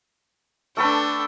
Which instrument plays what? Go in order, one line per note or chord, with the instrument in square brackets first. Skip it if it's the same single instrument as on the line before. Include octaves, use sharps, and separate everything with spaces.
[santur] A3 A4 B4 [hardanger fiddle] D4 G5